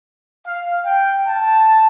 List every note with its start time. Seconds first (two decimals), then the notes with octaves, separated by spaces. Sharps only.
0.46 F5
0.86 G5
1.27 A5